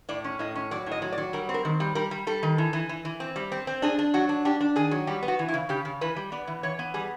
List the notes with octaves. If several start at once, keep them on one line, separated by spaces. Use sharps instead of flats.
A2 D5
C#4
A2 D#5
C#4
F#3 D5
A2
D#5
F#3
D5
F#3
G3 A#4
C4
A#4
D#3
G3
G3 A#4
G3
G3 A4
D#3
E3
E3
E3
E3
C4
G3
C4
C4
D4 G#4
D4
F#3 F#4
D4
D4 G4
D4
D#3 G#4
F#3
G3 G4
B3
F#4
E3
E4
C#3
C#3 G4
C#3
E3 B4
G3
B3 D5
E3
E3 C#5
B3
G3 G#4